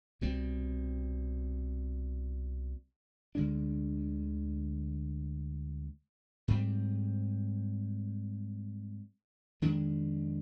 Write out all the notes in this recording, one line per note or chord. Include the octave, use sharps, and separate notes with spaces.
C2 B2 G3 C4
D2 D3 G#3 D4
G#2 G3 C4
F2 D#3 G#3 D4